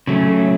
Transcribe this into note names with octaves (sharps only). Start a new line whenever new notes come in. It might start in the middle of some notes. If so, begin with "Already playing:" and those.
C#3 F#3 A3 C#4